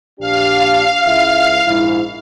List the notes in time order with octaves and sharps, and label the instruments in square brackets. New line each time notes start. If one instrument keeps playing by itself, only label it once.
[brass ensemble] A#1 D4 G4 [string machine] F5
[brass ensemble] C#2 E4 E5
A#1 G#2 E4